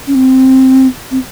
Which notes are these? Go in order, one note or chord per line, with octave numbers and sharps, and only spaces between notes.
C#4
C4
C4